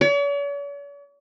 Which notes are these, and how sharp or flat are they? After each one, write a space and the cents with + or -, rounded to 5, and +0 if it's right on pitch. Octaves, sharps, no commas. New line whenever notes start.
C#5 +45